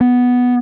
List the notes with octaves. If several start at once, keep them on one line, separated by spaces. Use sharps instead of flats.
B3